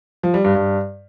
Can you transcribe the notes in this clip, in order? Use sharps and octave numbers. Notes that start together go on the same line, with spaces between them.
F3
G3
G2
G2